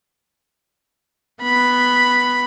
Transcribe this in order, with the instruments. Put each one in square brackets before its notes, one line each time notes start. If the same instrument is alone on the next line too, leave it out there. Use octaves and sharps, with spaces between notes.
[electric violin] B3 B5